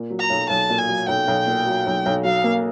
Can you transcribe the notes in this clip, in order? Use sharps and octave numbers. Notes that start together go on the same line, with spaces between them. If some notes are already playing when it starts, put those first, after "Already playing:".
Already playing: A#2
F#3
A#5
B1
B1 A5
A#2
G#5
F#3
B1 G5
B1
A#2
F#3
B1
B1
F#3 F5
A#3